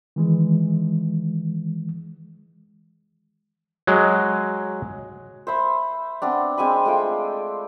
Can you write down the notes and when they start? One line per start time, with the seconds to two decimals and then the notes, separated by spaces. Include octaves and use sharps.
0.16 D#3 E3 G#3
3.87 F#3 G#3
5.47 C5 E5 B5 E6
6.22 B3 C4 D4
6.58 G#3 C4 G#5 B5
6.85 G#3 A3 F4 G5